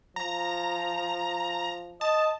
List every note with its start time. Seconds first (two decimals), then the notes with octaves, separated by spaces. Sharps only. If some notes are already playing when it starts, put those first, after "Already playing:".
0.16 F3 A#5
2.01 D#5 A5